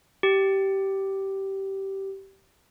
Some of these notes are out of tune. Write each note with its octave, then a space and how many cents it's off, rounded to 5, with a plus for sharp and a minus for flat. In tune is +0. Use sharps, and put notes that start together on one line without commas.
G4 -15